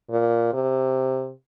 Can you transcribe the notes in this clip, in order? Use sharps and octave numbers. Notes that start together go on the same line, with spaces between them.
A#2
C3